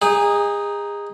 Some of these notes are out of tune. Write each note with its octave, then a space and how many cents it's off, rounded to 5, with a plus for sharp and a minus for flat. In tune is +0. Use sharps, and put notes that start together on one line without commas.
D#4 +0 G#4 -30